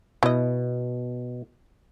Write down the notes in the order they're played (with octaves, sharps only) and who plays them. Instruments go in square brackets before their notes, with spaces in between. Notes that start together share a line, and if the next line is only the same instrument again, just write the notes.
[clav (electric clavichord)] B2 [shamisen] E4 D#5